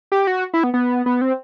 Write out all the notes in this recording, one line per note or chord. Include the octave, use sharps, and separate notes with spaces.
G4
F#4
E4
B3
B3
B3
C4